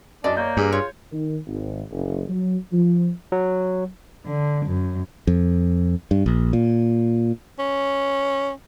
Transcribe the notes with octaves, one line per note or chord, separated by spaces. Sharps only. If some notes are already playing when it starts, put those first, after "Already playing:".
F#2 D4 D5 D#5
A#3 C#5 D#5 G6
G2 G#4
F4 C#5
D#3
G#1
F#1
F#3
F3
F#3
D3
F#2
F2
G2
A#1
A#2
C#4